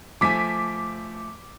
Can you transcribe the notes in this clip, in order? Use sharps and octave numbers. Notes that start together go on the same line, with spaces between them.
F3 A3 G#5 D6 B6